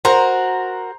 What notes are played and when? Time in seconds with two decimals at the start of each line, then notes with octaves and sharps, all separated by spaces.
0.05 F#4 A#4 C5 A#5 C6